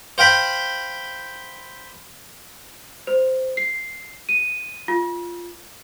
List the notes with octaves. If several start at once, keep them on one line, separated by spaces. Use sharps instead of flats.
C5 F5 G5 B5
C5
C7
D#7
F4